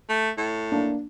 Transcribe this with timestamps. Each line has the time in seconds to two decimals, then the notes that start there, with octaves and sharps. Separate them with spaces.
0.09 A3
0.37 A2
0.72 A#3 D4